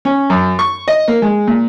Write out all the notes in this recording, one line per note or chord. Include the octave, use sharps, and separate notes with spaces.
C#4
F#2
C#6
D#5
A#3
G#3
A#2